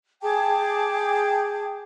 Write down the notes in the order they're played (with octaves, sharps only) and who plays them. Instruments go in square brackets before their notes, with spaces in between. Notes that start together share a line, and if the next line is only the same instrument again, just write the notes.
[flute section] G#4 G5 A5 D6